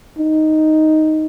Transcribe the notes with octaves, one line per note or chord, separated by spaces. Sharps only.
D#4